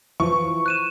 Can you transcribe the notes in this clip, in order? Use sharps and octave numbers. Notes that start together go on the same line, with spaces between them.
E3 F3 C#6
F#6 D#7 E7